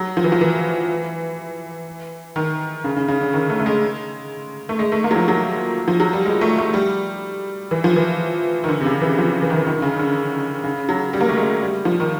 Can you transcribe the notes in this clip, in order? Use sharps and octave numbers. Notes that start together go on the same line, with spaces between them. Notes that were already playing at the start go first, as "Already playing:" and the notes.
Already playing: F#3
F3
E3
F3
E3
D#3
C#3
C#3
C#3
D3
D#3
A3
A3
G#3
A3
G#3
A3
A#3
F#3
F3
F#3
F3
F#3
G3
G#3
A3
A3
G3
E3
F3
E3
D#3
D3
C3
C#3
E3
F3
E3
D#3
E3
D#3
D3
C#3
D3
C#3
F#3
G3
A#3
A3
G#3
G3
F3
D#3